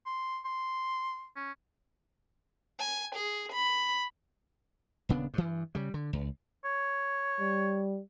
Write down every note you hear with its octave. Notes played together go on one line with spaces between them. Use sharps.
C6
C6
C#4
G#5
G#4
B5
D#1 C#3 B3 D4
G2 E3
C#3 G3
D3
C#2
C#5
G3